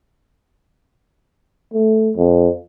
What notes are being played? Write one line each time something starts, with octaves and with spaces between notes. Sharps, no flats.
A3
F2